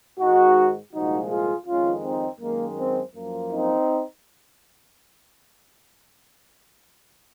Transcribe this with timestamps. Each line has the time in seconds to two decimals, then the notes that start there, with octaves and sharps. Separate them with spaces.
0.19 G#2 D#3 G#3 D#4 F#4
0.93 C2 A#2 F3 G#3 D#4 F#4
1.30 F4 G#4
1.67 F2 D#3 G#3 C#4 F4
2.04 C4 D#4
2.41 F#2 D#3 G#3 A#3
2.78 C4
3.15 F#2 F3 A#3
3.52 C4 D#4